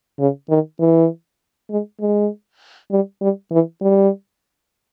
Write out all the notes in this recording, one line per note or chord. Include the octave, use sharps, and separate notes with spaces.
C#3
D#3
E3
G#3
G#3
G3
G3
E3
G3